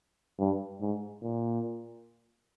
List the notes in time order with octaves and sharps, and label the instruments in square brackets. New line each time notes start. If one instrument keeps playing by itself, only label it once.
[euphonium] G2
G#2
A#2